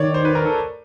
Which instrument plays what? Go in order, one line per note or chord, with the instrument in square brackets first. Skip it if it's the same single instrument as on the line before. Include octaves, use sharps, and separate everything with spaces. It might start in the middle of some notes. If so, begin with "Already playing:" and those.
Already playing: [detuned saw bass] D#3 [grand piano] C#5 D5
[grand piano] C5
B4
A#4
A4